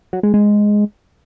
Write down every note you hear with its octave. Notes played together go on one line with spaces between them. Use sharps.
F#3
G#3
G#3